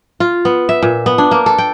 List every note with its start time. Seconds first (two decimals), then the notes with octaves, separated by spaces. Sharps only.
0.20 F4
0.45 B3
0.69 E5
0.83 A#2
1.06 B3
1.18 D4
1.31 A#3
1.46 A4
1.58 G5